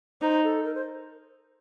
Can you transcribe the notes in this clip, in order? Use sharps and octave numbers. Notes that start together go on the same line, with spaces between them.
D#4 C5
A4
A#4
C5